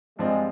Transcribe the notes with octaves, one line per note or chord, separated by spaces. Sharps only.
G2 F3 G#3 C4 F4